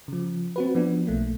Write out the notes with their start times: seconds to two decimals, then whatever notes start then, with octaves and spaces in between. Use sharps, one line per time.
0.08 C#3 F3
0.56 C4 F#4 B4
0.75 F3 B3 D4
1.07 B1 A3 A#3